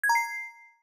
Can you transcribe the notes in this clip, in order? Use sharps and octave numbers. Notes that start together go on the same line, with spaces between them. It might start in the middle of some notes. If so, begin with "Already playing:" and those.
G#6
A#5
C7